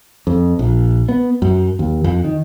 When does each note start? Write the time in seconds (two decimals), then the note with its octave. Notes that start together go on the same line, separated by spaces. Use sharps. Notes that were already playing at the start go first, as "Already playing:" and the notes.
0.27 F2
0.59 A#1
1.09 B3
1.42 F#2
1.79 D#2
2.04 F2
2.24 D#3